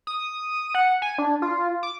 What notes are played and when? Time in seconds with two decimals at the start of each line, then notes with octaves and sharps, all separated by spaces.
0.07 D#6
0.75 F#5
1.02 G#5
1.18 D4
1.42 F4
1.83 D6